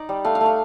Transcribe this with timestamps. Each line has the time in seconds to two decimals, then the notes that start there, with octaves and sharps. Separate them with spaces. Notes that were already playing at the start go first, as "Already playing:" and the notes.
Already playing: D#4 D5
0.09 G3
0.24 A3 F5
0.35 F5
0.41 A3
0.46 F5